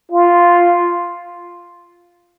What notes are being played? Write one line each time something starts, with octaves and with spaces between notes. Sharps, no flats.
F4